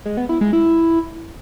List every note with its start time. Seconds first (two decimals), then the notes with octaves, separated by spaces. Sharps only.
0.05 G#3
0.17 B3
0.29 E4
0.41 G#3
0.53 E4